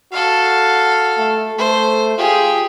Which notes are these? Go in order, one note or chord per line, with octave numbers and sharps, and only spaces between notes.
F#4 A4 F5
A3
A3 C5
F4 G4 G#4